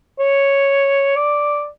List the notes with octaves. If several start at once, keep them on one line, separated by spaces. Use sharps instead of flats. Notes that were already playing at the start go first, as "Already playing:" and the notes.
C#5
D5